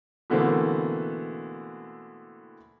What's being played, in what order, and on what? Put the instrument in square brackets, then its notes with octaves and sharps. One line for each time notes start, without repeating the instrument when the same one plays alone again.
[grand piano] B2 D3 E3 A3 A#3 C4